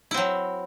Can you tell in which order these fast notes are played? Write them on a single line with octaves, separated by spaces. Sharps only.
E4 C4 F#3